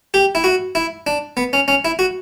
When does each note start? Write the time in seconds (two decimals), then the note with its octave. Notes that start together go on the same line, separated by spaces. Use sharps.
0.14 G4
0.35 E4
0.44 F#4
0.75 E4
1.07 D4
1.37 B3
1.53 C#4
1.68 C#4
1.85 E4
1.99 F#4